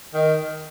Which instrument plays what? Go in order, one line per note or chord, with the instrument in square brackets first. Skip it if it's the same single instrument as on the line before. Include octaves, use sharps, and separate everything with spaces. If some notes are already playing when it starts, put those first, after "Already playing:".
[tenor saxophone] D#3